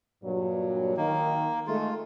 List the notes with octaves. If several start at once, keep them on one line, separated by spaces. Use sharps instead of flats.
G2 A#2 F#3
D#3 A#3
D#3 G#3 A3 F4